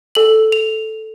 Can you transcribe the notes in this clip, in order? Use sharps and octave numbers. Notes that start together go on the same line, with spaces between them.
A4 F#7
F7